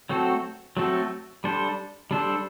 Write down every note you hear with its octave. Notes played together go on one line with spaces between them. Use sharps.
F#3 A3 C4 F#4 A4
F#3 A3 C4 F#4 A4
G3 D4 A4 C5
G3 D4 A4 C5